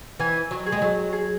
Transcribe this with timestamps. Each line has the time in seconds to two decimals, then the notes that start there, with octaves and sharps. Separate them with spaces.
0.19 E3 G#5
0.51 F#3
0.66 G#4
0.72 G#3
0.82 F#3
1.13 G#4